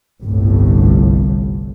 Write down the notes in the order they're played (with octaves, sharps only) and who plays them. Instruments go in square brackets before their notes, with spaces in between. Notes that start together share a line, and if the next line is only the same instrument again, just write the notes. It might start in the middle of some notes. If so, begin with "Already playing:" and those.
[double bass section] G1 C2 A2